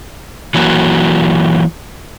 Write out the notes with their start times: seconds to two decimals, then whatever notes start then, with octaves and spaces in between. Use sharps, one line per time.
0.54 E3 F#3 A#3 F#4